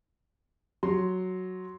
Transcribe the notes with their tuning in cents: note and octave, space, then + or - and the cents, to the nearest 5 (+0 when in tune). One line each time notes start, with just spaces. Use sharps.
F#3 +0 C6 +0